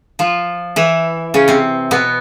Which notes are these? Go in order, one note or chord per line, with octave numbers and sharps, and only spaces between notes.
F3 F4
E3 E4
C#3 C#4
C3 C4
B2 B3